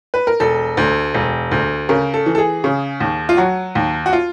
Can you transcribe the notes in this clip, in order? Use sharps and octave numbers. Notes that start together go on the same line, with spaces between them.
B4
A#4
E1 A4
D2
E1
D2
C#3 A#4
A4
E3
A4
G#4
C#3
D#2
F4
F#3 F#4
D#2
F#4
F4